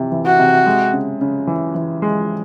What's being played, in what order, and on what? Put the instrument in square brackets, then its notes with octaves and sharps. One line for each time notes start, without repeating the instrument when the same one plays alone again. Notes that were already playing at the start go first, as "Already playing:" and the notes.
Already playing: [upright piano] C3 E3
E3
[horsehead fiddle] F#4
[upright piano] C3
G#3
C#3
C#3
E3
E3
G#3